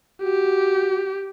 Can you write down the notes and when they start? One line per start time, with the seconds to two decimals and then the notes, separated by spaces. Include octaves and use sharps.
0.23 F#4 G4